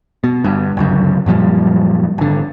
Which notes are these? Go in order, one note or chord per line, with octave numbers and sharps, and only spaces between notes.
B2
G1 G2
G1 C#2 F#2
F#2 A#2 F3 G3
G#1 D3